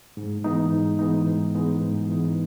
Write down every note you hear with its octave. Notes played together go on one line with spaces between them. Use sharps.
G#2
E3 G#3 B3 D#4
G#2
E3 G#3 B3 D#4
G#2
E3 G#3 B3 D#4
G#2
E3 G#3 B3 D#4